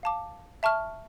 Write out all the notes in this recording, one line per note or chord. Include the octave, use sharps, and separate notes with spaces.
F5 A5 D6
E5 A5 C#6 F6